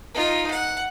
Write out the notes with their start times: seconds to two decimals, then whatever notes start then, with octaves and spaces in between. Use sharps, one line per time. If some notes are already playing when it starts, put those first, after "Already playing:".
0.15 D#4 F4
0.51 F#5